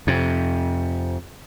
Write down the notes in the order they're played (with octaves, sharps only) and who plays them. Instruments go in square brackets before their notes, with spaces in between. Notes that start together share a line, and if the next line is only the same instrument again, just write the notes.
[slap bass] F2 C3